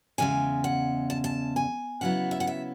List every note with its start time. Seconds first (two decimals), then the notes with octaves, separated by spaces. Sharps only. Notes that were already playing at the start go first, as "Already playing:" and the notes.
0.18 E2 C#3 G#3 G#5
0.64 F#5
1.10 A5
1.24 A5
1.56 G#5
2.01 C#3 F#3 B3 E4 F#5
2.31 E5
2.40 F#5
2.47 E5